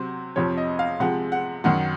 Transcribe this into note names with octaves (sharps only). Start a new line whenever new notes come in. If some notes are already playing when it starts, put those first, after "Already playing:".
Already playing: C3 F#3 C5
F2 C3 F3 C#5
D#5
F5
C3 F3 G#3 F#5
F#5
F#2 D#3 F#3 F#5